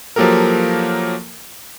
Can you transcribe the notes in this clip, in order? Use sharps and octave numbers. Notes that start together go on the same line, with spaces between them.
F3 F#3 A#3 G4 A4 A#4